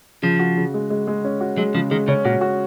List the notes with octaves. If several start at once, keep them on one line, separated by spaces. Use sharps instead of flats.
C#3 F3
F#4
C#3
G#3
G#3
G#3
C#4
F#4
F#3 G#3
C#3 F3
D#3 G#3
C#3 C#4
A#2 F#4
F#4